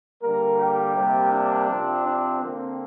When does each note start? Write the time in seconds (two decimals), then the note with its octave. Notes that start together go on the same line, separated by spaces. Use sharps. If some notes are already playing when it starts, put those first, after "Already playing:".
0.22 D3 G3 A#3 A#4
0.58 G4
0.95 C3 G3 A#3
1.31 D4
1.69 C3 F3 C4
2.05 D4
2.42 D3 A#3 C4